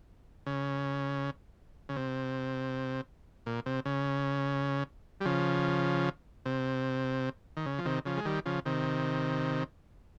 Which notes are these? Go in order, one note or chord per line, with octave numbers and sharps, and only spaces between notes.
C#3
C#3
C3
A#2
C3
C#3
G3
C#3 F3
C3
D#3
C#3
F3
C3 D#3
C#3 F3
G#3
D#3 G3
C#3 F3
C3 D#3